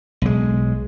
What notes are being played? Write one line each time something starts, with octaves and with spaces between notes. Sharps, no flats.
B1 G#3